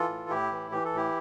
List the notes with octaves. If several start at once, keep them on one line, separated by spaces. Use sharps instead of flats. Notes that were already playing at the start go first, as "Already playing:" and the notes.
Already playing: E3 F4 A4
A2
A2 E4 G4
E3
E3 G4
A4
A2 E4 G4